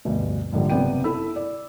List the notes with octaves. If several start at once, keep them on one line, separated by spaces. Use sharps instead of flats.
F1 D2 G2 B2
A#1 G#2 D3 G3
F#1 C3 B3 D5 G5 D#7
E4 A4 B5 E6
D5